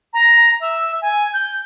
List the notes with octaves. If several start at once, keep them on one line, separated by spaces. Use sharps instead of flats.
A#5
E5
G#5
G6